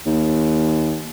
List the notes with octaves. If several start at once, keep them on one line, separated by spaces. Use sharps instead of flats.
D#2